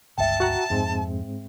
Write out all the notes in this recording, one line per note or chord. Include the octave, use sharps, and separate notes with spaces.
G1 C#2 G2 E5 G5 A5
F#4 F#5 A#5
F2 G#2 G#3 C4